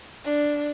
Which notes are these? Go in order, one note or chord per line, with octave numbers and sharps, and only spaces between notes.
D4